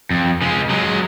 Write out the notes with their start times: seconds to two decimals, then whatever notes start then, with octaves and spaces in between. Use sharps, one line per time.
0.11 F2
0.42 C#3 G#3
0.70 F#3 G#3